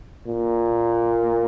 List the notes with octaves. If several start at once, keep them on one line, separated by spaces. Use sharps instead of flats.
A#2